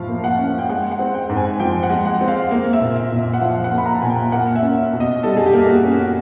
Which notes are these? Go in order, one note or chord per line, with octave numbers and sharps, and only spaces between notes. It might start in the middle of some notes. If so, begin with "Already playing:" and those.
Already playing: A2 F3 F5
A#3
F#5
C#4
G5
G#3 F#5
F#5
C4
G5
G#2
G#5
F3 G5
F#5
G#3
F#5
C4
F5
A#3
E5
A#2
E5
A#2
E5
F#5
F3 F5
F#5
A#3
B5
A#5
A5
A#2 G#5
G5
A#3 F#5
E5
C#4
E5
B2
D#5
G3 A4
G#4
G4
A#3
F#4
C#4
F#4